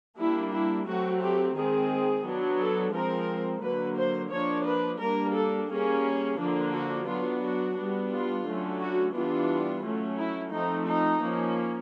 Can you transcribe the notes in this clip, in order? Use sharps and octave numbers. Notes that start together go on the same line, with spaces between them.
G3 A#3 D4 E4
E4
F#3 A3 C4 F#4
G4
D#3 G#3 C4 G#4
F#3 B3 D4
A4
F3 G#3 C4 A#4
D3 F#3 A#3 B4
C5
F3 A#3 D4 C#5
B4
G3 A#3 D4 A#4
A4
G3 A#3 C#4 G#4
D3 F3 A#3 D4
F#4
F#3 B3 D4 F4
F#4
G3 B3 D4
F4
D3 F#3 A3 C#4
F#4
E3 G3 B3 D4 F4
F#3 A3 C#4
E4
F3 A3 C4 D#4
D#4
F3 A#3 C#4